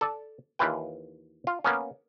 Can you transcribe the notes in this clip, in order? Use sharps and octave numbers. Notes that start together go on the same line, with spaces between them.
A4 D5
D#2 E3 F4 B4 G5
F4
A#3 B3 C#4